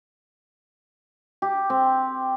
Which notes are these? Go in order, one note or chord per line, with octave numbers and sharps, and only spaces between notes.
G4
C4